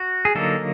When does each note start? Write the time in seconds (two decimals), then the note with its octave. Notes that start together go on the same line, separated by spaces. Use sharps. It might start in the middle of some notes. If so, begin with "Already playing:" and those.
Already playing: F#4
0.25 G#4
0.35 D3 F#3 A#3 D#4 A4